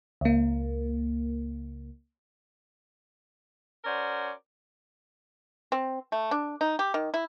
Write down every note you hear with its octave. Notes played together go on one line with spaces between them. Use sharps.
C#2 A#3
C#4 F#4 A#4 C5 D5
C4
A3
D4
D#4
G4
D#3
E4